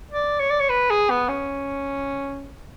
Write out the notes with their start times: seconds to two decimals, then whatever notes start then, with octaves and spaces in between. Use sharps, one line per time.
0.10 D5
0.40 C#5
0.50 D5
0.60 C#5
0.69 B4
0.90 G#4
1.10 B3
1.29 C#4